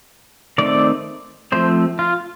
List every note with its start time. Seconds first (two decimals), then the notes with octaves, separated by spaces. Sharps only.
0.58 D#3 A3 C4 D5
1.52 F3 A3 C4 C5
1.99 F4